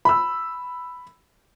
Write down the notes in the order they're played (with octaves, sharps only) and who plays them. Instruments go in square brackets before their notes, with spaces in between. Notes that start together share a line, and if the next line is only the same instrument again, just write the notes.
[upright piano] B5 E6